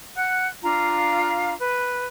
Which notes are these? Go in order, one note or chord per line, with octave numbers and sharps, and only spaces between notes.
F#5 F#6
D4 F4 F5 A#5
B4